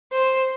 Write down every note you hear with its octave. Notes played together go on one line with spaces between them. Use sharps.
C5